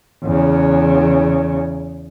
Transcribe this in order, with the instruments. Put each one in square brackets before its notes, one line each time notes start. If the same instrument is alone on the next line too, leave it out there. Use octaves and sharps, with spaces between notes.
[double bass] E2 C#3